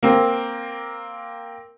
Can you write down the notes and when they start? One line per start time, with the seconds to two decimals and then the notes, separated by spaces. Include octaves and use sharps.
0.03 A#3 C4